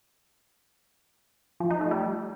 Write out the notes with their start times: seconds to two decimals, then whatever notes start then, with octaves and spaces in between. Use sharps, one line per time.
1.60 F3
1.71 D#4
1.81 A3
1.91 G3